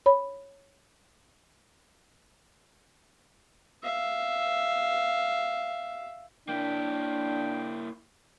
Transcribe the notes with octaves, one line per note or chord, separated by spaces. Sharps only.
C#5 B5
E5 F5
A#3 D4 E4 G5